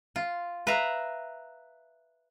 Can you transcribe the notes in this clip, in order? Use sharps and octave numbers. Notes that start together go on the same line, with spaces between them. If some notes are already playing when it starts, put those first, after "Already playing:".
F4
B4 E5 F5 A#5